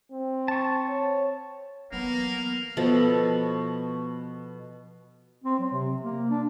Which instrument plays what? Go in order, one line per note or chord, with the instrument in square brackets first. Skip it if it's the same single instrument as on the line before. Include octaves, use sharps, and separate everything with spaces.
[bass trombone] C4
[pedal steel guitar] A5 C#6
[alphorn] C#5
[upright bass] E3 F#3 [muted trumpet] A#3 [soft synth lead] B3 [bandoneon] F6
[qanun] B2 F3 A4
[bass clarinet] C4
F#3
C3
A#3
D4